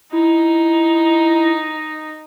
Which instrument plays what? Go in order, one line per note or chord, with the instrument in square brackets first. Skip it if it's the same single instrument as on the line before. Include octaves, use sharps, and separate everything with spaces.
[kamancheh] D#4 [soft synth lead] E4